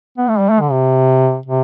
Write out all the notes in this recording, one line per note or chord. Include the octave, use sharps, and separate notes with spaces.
B3
A3
G3
A3
D3
C3
C3